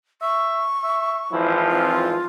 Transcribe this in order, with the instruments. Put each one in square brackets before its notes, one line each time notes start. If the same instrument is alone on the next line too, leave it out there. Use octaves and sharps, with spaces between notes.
[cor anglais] E5 [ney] C#6
[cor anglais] E5
[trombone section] G#1 E3 F3 [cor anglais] E4
[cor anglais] C4 [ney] F4